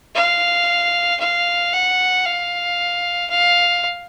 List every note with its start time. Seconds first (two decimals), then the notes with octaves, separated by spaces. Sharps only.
0.15 F5
1.20 F5
1.73 F#5
2.25 F5
3.30 F5